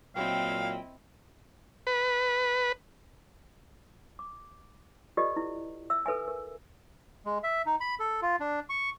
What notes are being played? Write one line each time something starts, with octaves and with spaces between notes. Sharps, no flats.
A#2 F#3 C4 E4 D#5 F5 G5
B4
D6
F4 G4 A4 B4 D5 D#5
E4
E5 E6
A4 B4 E5 G#5
A#4
G#3
E5
D#4
B5
A4
F4
D4
C#6